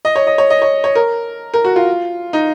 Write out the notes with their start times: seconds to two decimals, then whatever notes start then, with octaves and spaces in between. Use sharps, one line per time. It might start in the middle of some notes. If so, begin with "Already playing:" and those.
0.05 D#5
0.15 C#5
0.27 D#5
0.38 C#5
0.50 D#5
0.62 C#5
0.84 C#5
0.95 A#4
1.54 A#4
1.64 F#4
1.76 F4
2.33 D#4